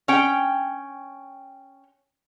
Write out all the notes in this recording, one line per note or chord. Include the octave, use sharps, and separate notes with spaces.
C#4 G5